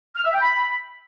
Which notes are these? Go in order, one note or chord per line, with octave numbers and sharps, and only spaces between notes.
F6
E5
G5
B5